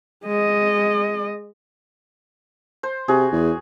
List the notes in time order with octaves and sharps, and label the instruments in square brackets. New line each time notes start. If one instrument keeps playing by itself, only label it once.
[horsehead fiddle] G#3 D#5
[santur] C5
[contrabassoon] C3 [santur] F#4 G#4
[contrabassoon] E2